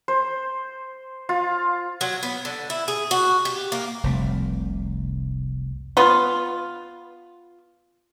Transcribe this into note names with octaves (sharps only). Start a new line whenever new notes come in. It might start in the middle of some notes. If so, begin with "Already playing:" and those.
C5
F4
F#3
B3
D3
E4
G#4
F#4
G4
A#3
F1 C2 A3
B3 F4